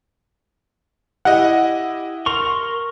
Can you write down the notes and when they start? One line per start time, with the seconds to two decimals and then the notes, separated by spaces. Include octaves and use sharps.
1.25 E4 G4 D#5 F#5
2.26 A#4 C6 C#6 F7